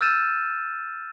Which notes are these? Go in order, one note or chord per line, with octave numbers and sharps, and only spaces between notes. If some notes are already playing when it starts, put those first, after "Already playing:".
E6 F6 G6 A6 D#7 E7